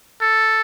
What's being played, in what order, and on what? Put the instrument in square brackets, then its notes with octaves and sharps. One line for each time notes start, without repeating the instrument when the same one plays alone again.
[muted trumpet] A4